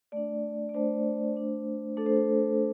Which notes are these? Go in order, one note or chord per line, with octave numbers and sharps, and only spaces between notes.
A3 D4 D5
D5
A3 D4 C5
A3 D4
A3 D4 A4
C5
A4